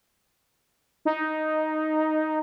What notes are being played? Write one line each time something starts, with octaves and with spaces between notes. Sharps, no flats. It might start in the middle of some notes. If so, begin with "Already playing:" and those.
D#4